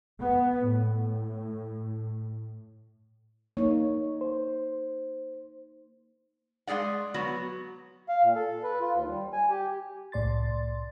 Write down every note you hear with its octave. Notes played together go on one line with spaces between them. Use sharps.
B3
A2
A#3 D#4 C#5
C5
G#3 A3 G#4 D5 F#5
F#3 B3 F#4
F5
A#2
A4
B4
F4
D#2
G3
G#5
G4
C2 A2 D5 C6 A6